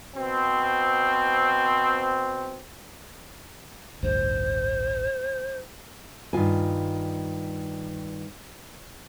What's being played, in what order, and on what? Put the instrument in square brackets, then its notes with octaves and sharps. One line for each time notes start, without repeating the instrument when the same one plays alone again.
[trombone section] B2 C4
[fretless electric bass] A1 D2 G2 [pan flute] C5
[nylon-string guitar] G2 D#3 F4 G#5